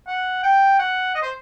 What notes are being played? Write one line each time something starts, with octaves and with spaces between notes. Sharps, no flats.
F#5
G5
F#5
D#5
C5